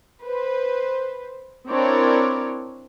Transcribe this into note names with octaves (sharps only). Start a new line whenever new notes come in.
B4 C5
C4 D4 E4 A#4 C#5 D5